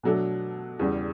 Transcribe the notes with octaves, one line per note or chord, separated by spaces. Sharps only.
B2 F#3 A3 D4 A4
E2 C#3 G3